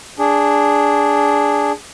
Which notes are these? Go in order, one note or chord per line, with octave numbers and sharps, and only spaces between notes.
D4 G#4